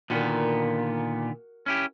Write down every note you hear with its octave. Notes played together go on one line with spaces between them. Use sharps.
A#2 D3 D#3 B3 F#4 A#4
C#4 E4 G4